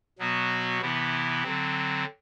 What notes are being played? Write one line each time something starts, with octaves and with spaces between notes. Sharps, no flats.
B2 F#3 B3 F#4
C3 E3 B3 E4
D3 F#3 C4